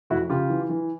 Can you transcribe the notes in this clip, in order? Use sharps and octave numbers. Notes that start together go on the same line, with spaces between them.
F2 E4 F#4
C#3 F4 G4
E3
E3